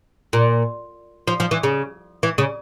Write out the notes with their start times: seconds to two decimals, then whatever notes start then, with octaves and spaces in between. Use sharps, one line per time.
0.33 A#2
1.27 F3
1.40 F3
1.51 E3
1.63 C#3
2.23 E3
2.38 C#3